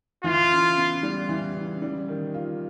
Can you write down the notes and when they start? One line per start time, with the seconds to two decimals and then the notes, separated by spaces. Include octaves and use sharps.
0.24 E3 F4
0.51 C#3
0.77 B3
1.03 G3
1.29 E3
1.56 C#3
1.82 G3
2.08 D#3
2.34 F4